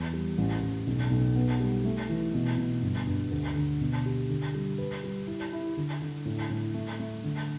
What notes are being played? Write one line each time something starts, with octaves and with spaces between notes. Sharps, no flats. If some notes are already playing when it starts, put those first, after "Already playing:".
Already playing: E2
G3
A1
A1
B1
B1
B3
G3
A3
E3
B2
B2
G1
G2
D2
D3
B2
G4
D3
G3
B4
G3
E4
E4
D3
D3
A2
A2
A3
A3
D3